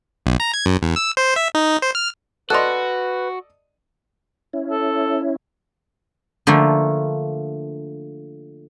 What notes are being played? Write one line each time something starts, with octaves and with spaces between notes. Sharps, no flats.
B1
A#5
G#6
F#2
E2
E6
C5
E5
D#4
C5
F6
F#4 A4 B4 D5 D#5 C6 F#6
C#4 E4
A4
D3 F3 A3 A#3